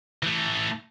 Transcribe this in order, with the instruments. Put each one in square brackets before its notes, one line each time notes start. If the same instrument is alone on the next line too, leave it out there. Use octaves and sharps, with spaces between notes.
[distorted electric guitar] E3 A3